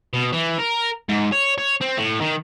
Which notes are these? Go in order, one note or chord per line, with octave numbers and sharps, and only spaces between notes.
B2
E3
A#4
G#2
C#5
C#5
C4
A2
D#3